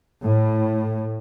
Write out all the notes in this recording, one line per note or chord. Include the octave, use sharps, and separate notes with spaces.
A2